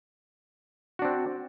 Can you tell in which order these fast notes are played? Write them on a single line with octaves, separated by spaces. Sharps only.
F#4 D4 C4